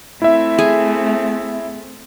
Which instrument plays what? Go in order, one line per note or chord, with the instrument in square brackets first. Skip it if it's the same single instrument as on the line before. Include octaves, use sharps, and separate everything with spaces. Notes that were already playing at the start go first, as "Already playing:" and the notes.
[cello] A3 C4 [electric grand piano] E4 E5
[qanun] G#4